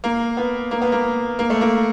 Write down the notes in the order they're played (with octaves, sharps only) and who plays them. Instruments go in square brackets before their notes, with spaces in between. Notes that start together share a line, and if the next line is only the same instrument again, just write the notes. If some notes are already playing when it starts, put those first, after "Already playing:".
[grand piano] A#3
B3
A#3
B3
A#3
A#3
A3
A#3